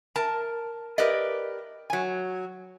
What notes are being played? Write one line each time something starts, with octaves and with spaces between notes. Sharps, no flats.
A#4 A5
G4 A#4 B4 D5 D#5
F#3 G#5